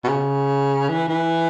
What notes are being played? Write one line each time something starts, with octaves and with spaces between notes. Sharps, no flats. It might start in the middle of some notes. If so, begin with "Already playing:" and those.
B2
C#3
E3
E3